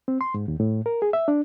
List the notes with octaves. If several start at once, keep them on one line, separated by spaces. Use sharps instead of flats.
C4
C6
G#2
D#2
A2
A#4
G#4
E5
D4